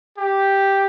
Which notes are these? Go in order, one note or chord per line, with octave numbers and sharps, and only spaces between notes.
G4